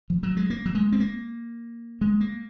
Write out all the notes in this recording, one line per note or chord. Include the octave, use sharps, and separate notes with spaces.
F3
F#3
G#3
A#3
F#3
G#3
C4
A#3
G#3
A#3